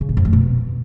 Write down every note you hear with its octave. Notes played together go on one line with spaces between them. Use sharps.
C#3
A2
F2
A3
B2